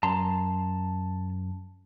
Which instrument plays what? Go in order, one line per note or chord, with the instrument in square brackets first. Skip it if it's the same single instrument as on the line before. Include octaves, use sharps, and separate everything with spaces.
[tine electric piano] F#2 [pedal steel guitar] A5 A#5 C6